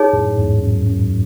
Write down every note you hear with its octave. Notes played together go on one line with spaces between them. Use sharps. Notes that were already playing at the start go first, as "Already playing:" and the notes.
Already playing: D#4 G#4 C#5
F#2 A2
E2 G#2
F#2
F#2